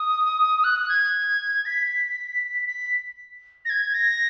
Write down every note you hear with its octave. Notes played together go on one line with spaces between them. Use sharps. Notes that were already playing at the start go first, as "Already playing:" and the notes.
Already playing: D#6
F#6
G#6
B6
B6
A#6
G#6
A#6